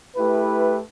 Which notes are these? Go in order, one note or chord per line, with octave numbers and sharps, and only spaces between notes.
A3 E4 G4 B4